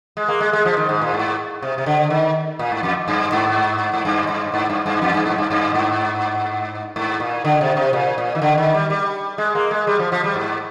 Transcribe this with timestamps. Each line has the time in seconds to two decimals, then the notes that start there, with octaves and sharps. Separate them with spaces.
0.17 G#3
0.28 A#3
0.41 G#3
0.53 G#3
0.65 F3
0.77 D#3
0.89 G#2
1.02 A#2
1.14 G#2
1.62 C3
1.78 C3
1.86 D3
2.10 D#3
2.59 A#2
2.72 G#2
2.83 F2
3.08 G2
3.32 G#2
3.94 G#2
4.05 G2
4.29 G2
4.54 G#2
4.70 G2
4.86 G2
5.02 F2
5.14 G2
5.26 G#2
5.38 G2
5.51 G2
5.74 G#2
6.96 G#2
7.20 A#2
7.45 D3
7.61 C3
7.77 C3
7.93 A#2
8.18 A#2
8.35 D#3
8.42 D3
8.58 D#3
8.74 G3
8.90 G3
9.38 G#3
9.55 A#3
9.71 G#3
9.87 G3
9.99 F3
10.12 F3
10.24 G3
10.36 G#2